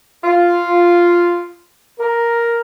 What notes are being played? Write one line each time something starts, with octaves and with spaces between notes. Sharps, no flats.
F4
A#4